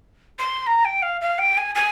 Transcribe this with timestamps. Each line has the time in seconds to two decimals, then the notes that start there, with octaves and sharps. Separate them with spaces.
0.39 C6
0.67 A#5
0.85 G5
1.02 F5
1.21 F5
1.39 G5
1.57 G#5
1.75 G#5